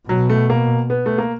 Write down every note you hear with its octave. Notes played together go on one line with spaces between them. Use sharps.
B2 F#3
A3
A#3
B3
A3
A#3